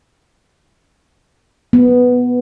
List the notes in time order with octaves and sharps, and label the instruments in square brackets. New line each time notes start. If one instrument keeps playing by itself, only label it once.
[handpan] B3